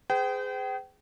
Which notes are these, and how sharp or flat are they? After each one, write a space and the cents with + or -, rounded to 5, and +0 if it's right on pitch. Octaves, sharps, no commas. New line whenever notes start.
G#4 +0 C5 -45 G5 -30